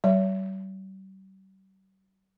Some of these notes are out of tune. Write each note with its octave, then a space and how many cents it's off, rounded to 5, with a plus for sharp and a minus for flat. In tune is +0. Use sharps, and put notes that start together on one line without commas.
G3 -40 C#5 +35